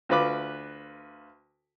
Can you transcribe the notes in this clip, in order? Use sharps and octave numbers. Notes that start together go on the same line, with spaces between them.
D2 F4 B4 D6